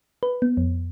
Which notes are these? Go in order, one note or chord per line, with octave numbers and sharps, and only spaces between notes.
B4
B3
F2